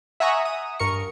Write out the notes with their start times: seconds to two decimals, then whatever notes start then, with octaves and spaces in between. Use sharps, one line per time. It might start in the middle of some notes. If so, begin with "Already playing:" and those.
0.20 E5 F#5 G#5 A#5 C#6 D#6
0.45 D#6
0.79 G2 A#4 C#6 C#7